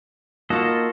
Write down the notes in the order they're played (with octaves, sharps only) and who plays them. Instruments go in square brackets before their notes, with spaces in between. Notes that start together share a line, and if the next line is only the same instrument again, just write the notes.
[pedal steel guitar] A#3 A4 D#5 [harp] F4 F#4